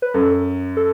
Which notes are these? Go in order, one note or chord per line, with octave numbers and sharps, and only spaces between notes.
B4
F#2 A4
A4